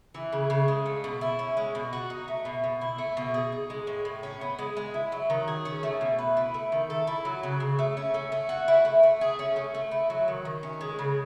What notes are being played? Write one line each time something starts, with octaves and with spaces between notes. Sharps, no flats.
E3
C#3
C#3
G#3
A3
B2
E4
C#4
G#3
B2
F#4
D#4
A3
B2
B2
E4
A3
B2
G#4
D#4
G#3
A2
A2
C#4
B3
G#3
G#3
E4
F#3
D#3
G#4
C#4
A3
B2
B4
E4
A3
D#3
A4
E4
F#3
C#3
C#3
A3
C#4
A3
A3
F#4
E4
A3
A3
G#4
C#4
A3
A3
E4
F#3
D#3
D#3
C#4
G#3
C#3